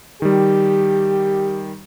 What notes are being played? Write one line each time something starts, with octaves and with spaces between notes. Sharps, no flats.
D#3 G3 G4